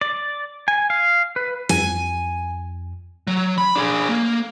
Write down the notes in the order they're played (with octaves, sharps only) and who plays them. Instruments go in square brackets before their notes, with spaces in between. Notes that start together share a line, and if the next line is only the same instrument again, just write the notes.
[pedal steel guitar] D5
G#5
F5
B4
[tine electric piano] F2 [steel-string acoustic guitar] G#5
[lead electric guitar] F#3
B5
D4 G#4
A#3